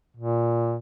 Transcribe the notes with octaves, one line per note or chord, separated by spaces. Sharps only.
A#2